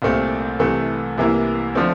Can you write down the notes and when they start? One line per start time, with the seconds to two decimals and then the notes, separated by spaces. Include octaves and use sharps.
0.02 C2 A#2 A3 C4
0.59 C2 C3 E3 A3
1.18 C2 C3 E3 A#3 E4
1.75 D3 F3 A3 C4